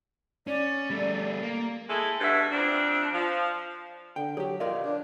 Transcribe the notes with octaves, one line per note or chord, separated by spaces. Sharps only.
C#4 D5
G3 A3
A#3
G#3 E4 A4
G2 B2 E5
F2 C4 D4
F3
D3 G5
F#3 G4 G#4
F4 A#4 D5 D#5
D4